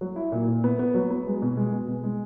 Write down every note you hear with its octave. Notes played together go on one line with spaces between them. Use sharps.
F#3
E4
A#2
A#2
B3
B3
F#3
B3
G#3
B2
G#3
B3
B2
G#3